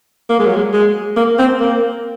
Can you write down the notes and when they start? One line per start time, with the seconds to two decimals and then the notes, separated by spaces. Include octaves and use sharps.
0.30 A#3
0.39 G#3
0.47 F#3
0.56 G#3
0.73 G#3
1.17 A#3
1.39 C4
1.60 A#3